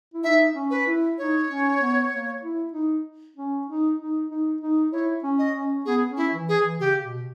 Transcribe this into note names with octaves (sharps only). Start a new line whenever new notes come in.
E4
D#4 E5
C#4
B4
E4
D#4 C#5
C#4
B3
A#3
E4
D#4
C#4
D#4
D#4
D#4
D#4
E4 C#5
C#4
D#5
C#4
B3 G#4
C#4
E4
E3
G#4
E3
C#3 G4
B2